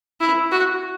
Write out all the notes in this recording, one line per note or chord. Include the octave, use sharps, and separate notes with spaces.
E4
F#4